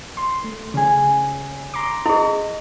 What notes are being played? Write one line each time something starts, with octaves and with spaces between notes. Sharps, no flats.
C6
A3
C#3 C#4 G#4
A#5 C6 D6
E4 G#4 D#5